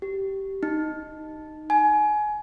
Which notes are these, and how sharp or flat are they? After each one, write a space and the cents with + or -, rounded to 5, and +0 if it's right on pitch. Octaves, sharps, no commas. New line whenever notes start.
G4 -15
D#4 -5
G#5 +25